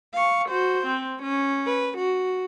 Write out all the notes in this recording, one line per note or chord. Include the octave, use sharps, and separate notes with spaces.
F5 C#6
F#4 C5
C4
C#4
B4
F#4